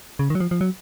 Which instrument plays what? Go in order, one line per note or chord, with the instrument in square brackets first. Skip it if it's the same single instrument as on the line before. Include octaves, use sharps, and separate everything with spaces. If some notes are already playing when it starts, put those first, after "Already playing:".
[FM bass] C#3
D#3
F#3
F3
F3
F#3